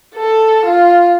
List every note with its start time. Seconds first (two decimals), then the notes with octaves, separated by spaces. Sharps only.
0.15 A4
0.65 F4